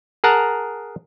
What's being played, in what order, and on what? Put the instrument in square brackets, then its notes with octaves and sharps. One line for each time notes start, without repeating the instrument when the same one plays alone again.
[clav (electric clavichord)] G#4 A#4 F#5 A5 A#5